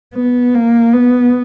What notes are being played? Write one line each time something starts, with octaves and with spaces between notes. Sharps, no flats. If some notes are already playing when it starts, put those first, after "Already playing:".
B3
A#3
B3